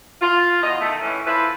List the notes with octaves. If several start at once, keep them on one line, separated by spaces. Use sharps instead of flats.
F4
E2 B2 F4 D#5
D#3 A3
A2 E3 A3 C#4
F3 E4 A4 B4